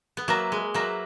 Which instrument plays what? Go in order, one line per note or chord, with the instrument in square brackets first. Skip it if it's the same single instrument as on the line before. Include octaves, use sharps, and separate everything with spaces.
[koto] B3
[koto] F#3 A#3 [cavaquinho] B4 E5 A#5
[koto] G#3
[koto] F#3 A#3 [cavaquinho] B4 E5 A#5